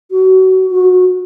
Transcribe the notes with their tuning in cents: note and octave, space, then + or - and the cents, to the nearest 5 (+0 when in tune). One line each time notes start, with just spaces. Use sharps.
F#4 +25
F#4 -20